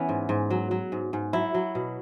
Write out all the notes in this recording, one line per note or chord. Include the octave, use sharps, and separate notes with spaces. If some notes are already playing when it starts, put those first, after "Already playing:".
Already playing: E3 B3 C#4
G#2
G#2
F#3
F#3
G#2
G#2
F#3 E4
F#3
B2